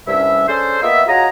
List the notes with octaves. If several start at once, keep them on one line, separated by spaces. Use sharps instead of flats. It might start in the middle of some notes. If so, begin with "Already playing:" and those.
C2 G2 G3 C#4 E5
C#4 D4 G#4 A4 C5
A#3 B3 F4 D#5 E5
F4 F#4 G#4 C#5 D#5 A#5